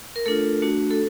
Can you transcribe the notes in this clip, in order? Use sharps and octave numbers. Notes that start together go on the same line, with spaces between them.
A#4
A3 D4 F4 A4
A3 D4 F#4
A4